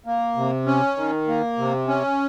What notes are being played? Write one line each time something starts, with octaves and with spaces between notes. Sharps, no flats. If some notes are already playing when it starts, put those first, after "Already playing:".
A#3
C3
C#4
D#3
A#3
C3
C#4